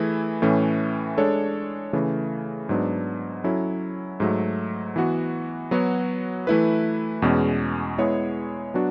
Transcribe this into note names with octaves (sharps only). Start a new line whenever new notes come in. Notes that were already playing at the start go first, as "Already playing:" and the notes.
Already playing: E3 A3 E4 G#4
A2 E3 A3 C#4
G#3 D4 A4 C#5
C#3 E3 A3
G#2 F#3 B3 D4
F#3 C#4 E4 A4 C#5
G#2 F#3 A3
E3 B3 F#4
F#3 B3 F#4 C#5
E3 A3 E4 B4
E2 B2 G#3 C#4
G#3 B3 E4 G#4 C#5
F#3 B3 D4 F#4